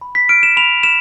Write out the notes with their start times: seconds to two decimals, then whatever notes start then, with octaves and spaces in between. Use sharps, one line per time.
0.01 B5
0.15 B6
0.29 F6 D7
0.43 E7
0.57 B5 F7
0.83 F6 E7